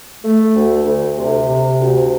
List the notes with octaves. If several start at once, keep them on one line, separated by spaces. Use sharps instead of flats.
A3
D2
D2
C3
C3
D2